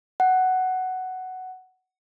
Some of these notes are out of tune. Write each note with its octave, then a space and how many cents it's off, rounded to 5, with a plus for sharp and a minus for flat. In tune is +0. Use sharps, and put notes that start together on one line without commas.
F#5 +10